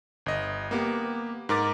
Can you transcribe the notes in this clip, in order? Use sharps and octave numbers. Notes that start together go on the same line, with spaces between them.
G1 D#5
A#3 B3 G4
G#2 A#4 D6 A6